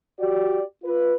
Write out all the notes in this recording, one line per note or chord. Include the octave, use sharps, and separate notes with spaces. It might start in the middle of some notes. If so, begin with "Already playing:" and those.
F#4 G4 D5
F4 B4